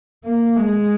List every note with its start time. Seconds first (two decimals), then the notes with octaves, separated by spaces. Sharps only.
0.24 A#3
0.56 G#3